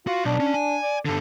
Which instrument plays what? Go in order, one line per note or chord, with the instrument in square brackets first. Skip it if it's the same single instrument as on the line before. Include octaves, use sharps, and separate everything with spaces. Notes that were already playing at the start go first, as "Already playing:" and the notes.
[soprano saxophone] F4 [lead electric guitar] F#4
[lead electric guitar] B1 [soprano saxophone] D4
[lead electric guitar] C#4
G#5
[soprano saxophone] D5
[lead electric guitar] G2 D3 [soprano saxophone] A4